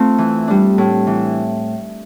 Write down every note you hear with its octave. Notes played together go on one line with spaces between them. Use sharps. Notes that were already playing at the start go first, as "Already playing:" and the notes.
Already playing: A3 C4 F4
E3
G3 D4
A2
E3